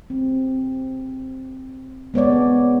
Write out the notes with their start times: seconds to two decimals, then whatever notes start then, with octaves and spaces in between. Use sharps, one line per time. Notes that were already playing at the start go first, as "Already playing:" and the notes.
0.10 C4
2.14 G#3 B3 C#5 D5